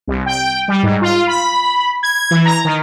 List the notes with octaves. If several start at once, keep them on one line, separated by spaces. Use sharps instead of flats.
C2
G5
G3
G#2
F4
B5
G#6
E3
A#5
D#3